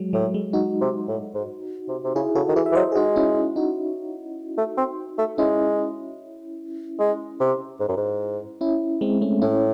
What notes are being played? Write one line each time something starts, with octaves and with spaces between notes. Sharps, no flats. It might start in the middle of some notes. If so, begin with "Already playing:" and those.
Already playing: F#3 G#3
A2 F#3
G#3
D#4 F#4
C3
A2
G#2
C3
C3
C#3 E4 G#4
C#3 F#4 A4
D#3
E3 E4 G#4
E5
E3
F#3 C5 D#5
G#4
G#3 D#4 F#4
C#4 E4
D#4 F#4
A3
C4
A3
G#3 C#4 E4
G#3
C3
G#2
F#2
G#2
C#4 E4
G#3 C4
A3 C#4
A2 C#4 E4